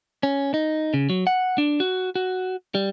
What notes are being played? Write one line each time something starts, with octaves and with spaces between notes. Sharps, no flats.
C#4
D#4
C#3
F#3
F#5
D4
F#4
F#4
G3